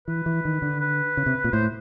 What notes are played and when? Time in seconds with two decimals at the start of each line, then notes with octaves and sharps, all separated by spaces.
0.08 E3 B4
0.26 E3
0.45 D#3
0.62 D3
0.81 B4
1.17 C#3
1.26 C3
1.44 A#2
1.53 A2 C5